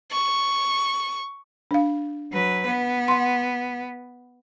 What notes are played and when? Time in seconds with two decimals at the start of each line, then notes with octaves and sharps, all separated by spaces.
0.11 C#6
1.71 D4 F5
2.32 F#3 B4
2.66 B3
3.08 F#5 C6